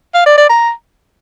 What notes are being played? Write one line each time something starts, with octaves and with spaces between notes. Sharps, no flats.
F5
D5
D5
A#5